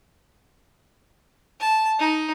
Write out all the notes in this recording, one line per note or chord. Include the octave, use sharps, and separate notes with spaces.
A5
D#4